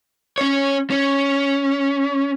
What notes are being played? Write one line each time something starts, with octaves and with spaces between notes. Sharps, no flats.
C#4 C#5
C#4